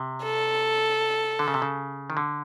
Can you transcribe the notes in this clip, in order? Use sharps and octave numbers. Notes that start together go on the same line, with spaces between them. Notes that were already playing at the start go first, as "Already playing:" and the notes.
Already playing: C3
A4
D3
C#3
C3
C#3
D#3
D3